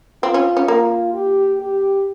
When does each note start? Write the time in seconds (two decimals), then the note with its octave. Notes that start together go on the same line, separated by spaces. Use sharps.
0.23 C4 F4
0.34 C#4
0.57 C#4
0.68 A#3 F4
1.14 G4
1.60 G4